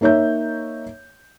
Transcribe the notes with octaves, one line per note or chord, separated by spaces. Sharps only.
A#3 D#4 C#5 E5 G6